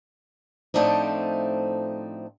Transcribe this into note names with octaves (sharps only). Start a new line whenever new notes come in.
A2 F3 A3 C4 D4 D#4